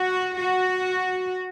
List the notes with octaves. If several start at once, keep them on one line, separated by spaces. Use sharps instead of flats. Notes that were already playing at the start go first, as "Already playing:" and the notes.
Already playing: F#4
F#4